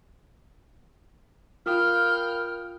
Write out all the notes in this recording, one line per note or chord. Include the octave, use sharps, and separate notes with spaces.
F4 A#4 F5 G5 B5 D#6 F6